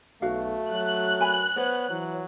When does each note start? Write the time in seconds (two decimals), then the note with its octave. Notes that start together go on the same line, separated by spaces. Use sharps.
0.22 B1 A3 F#4 F5
0.71 F#3 F#6
1.20 A#4 G#5 B5
1.56 B3 C5 C#5
1.90 E3 F#3